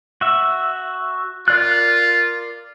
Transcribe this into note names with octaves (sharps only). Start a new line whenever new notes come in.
F#4 E5
F4 A#4 D5 F#6